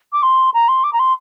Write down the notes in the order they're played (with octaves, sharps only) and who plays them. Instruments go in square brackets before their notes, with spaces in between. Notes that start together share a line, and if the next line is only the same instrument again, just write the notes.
[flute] D6
C6
A#5
C6
D6
A#5
C6